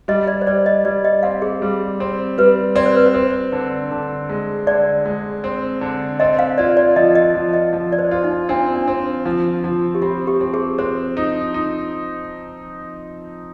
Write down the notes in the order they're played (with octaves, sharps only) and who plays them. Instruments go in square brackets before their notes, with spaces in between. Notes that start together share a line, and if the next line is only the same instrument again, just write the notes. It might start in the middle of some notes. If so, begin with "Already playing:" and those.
[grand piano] G3 [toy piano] D#5
[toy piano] D5
C5
[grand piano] G3 [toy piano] D5
[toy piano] D#5
[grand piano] G3 [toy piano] D5
[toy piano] D#5
[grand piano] C4 [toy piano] F5
[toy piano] G#4
[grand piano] G3
C4
[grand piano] G3 [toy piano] B4
[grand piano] C4 [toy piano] D5
[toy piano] C5
B4
C5
[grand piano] C4
D3
D3
G#3
[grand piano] D3 [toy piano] D5
[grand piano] G#3
C4
D3
[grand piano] C4 [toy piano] D#5
[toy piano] F5
[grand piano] F4 [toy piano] D5
[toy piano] D5
[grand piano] F3 [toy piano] D#5
[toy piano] D#5
[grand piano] F3
[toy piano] D#5
[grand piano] F3
[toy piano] D5
C5
[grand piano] F4
[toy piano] D#4
[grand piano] C4 [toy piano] D4
[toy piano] D4
[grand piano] C4
F3
F3
[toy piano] G4
[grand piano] C4 [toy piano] F4
[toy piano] G4
[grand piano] C4
[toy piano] G#4
[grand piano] C4 [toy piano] C5
[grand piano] D#4
D#4